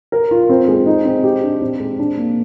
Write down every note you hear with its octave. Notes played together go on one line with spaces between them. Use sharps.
A#4
F4
C4
G#3
D#4
C4
G4
D4
C4
G#3
D4
A#3